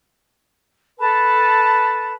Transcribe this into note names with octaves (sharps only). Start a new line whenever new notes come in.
A4 B4 A5